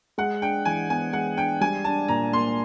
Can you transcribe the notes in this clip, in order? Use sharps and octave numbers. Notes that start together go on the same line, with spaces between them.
G#3 F#5
D4 G5
E3 G#5
B3 G#5
G#3 F#5
D4 G5
G3 G#5
D4 A5
A#2 A#5
A#3 C6